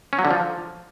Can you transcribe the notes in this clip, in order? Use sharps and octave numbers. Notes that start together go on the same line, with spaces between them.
C#4
F#3
D3
F3